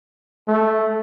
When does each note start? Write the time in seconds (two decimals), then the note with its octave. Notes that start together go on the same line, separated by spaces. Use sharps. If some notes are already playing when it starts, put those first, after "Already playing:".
0.48 A3